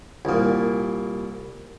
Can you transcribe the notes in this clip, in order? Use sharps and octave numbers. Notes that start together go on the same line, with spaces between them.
C2 A#2